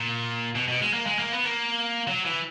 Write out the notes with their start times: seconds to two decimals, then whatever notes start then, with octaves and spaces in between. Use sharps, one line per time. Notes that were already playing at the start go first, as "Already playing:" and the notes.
Already playing: A#2
0.56 B2
0.68 B2
0.81 G#3
0.93 A#3
1.06 G#3
1.19 A#3
1.32 B3
1.44 A#3
2.08 F#3
2.25 E3